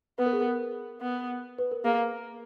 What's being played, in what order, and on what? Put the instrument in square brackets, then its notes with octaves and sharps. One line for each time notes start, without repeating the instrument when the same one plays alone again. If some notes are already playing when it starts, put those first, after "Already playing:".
[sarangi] B3 [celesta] B4
[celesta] A#4
G#4
A#4
[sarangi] B3
[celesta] B4
A#4
[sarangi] A#3 [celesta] G#4